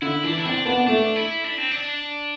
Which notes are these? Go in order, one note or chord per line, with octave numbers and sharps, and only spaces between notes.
D3 E4
E3 D4
E4
C4 D4
B3 D4
A3 D4
E4
D4
C4
D4